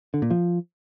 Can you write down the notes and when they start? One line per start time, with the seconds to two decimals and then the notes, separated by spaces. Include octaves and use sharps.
0.14 D3
0.22 A#2
0.30 F3